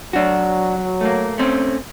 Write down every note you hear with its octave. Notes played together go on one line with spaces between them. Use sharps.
F#3 D4 F#4
A3 A#3
A3 C4 C#4